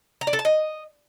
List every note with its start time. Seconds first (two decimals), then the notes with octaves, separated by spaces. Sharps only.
0.21 A#5
0.27 D5
0.33 A4
0.39 A5
0.45 D#5